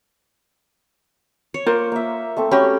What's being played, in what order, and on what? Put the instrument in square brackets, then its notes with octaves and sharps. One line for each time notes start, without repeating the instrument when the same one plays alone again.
[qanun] C#5
[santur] A#3 [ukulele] F4 A#4 C5
[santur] A#3 E5
A3 C4 A4
[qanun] C#4 [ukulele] F#4 G4 B5